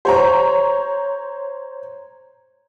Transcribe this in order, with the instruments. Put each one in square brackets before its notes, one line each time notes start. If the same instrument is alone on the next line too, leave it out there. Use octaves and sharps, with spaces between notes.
[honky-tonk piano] C5 C#5 A#5